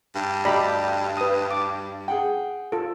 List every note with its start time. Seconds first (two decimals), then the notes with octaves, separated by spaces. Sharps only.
0.15 G2
0.45 D2 G4 D5 D#5 A#5 B5
1.17 B4 D#6
1.51 D6
2.08 G#4 F#5 G5
2.72 F4 A4